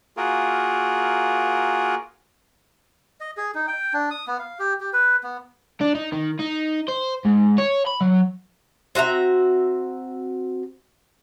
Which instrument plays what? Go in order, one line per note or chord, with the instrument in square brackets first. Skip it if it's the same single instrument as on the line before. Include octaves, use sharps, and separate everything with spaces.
[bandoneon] A#3 F4 F#4 G#4 A#4
[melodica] D#5
G#4
D#4
G5
D4
D#6
B3
F5
G4
G4
B4
B3
[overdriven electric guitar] D4
D#4
D#3
D#4
C5
G#2
C#5
B5
F#3
[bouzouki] C4 F#4 E5 A#5